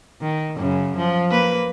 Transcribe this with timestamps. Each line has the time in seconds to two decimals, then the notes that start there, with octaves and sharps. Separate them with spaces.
0.21 D#3
0.56 F#2 C#3
0.97 F3
1.30 A#3 B4